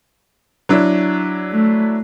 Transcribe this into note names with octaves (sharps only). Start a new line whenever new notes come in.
F#3 D4 E4
A3